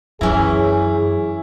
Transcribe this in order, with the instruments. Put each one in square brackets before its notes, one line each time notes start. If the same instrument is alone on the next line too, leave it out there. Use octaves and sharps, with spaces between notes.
[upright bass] F#2 C#3 [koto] E3 C#4 A#5 [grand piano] E4 [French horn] G#4